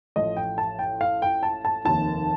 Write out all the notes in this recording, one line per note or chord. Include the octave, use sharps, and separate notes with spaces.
A1 A2 F3 D#5
G5
A5
G5
F5
G5
A5
A5
F1 D#2 D#3 A5